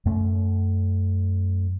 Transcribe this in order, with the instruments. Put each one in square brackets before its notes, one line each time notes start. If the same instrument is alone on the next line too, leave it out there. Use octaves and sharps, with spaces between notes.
[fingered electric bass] F#2 A3